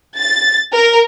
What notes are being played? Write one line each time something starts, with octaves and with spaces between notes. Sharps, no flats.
A6
A#4